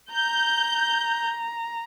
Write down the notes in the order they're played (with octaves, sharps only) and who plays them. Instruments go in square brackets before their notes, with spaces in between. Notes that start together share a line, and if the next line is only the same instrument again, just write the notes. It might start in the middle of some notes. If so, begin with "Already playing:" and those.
[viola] A#5 [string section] G6